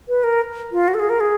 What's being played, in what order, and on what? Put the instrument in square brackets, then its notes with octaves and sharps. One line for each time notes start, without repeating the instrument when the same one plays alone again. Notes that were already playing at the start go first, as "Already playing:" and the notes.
[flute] B4
A#4
F4
F#4
A4
G#4
A#4
G#4